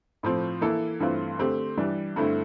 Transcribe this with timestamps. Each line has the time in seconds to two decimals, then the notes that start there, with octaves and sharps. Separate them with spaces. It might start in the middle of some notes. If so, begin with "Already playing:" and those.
0.23 A2 F3 C4
0.61 E3 A#3 E4 A4
1.00 G2 E3 A3 C4 F4
1.39 D3 A3 C4 G4
1.77 E3 G3 D4
2.16 G2 D3 A3 C4 E4